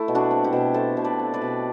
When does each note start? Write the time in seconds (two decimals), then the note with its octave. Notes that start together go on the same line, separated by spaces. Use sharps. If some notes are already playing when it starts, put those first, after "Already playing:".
Already playing: A3 E4 A4
0.08 B2
0.15 D4 F#4
0.31 C4
0.44 E4 G4
0.53 B2
0.74 A3 A4 C5
0.97 B2
1.04 B4 D5
1.19 C4
1.34 B4 D5
1.42 B2